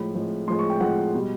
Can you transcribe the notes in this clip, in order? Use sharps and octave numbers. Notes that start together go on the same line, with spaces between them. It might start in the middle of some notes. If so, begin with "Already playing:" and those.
Already playing: A2 F3 G#3 B5
A2 F3 G#3
A2 F3 G#3 C6
C#6
G5
A2 F3 G#3 F#5
B2 G3